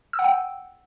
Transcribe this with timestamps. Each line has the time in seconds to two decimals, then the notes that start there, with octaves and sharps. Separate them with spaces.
0.13 E6
0.19 F#5
0.24 G5